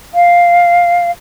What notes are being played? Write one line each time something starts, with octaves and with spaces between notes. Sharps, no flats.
F5